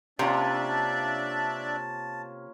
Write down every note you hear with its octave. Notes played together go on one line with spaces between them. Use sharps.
C3 A#3 C#4 D4 F4 D5 E5 A5